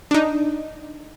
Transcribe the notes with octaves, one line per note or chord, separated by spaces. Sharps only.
D4 D#4